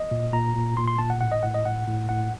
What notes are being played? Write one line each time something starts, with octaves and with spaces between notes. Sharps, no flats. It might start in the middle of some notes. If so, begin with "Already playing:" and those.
Already playing: D#5
A#2
A#2 A#5
A#2
A#2 C6
C6
A#2 A5
F#5
A2 F#5
D#5
A2 F#5
D#5
A2 F#5
A2
A2 F#5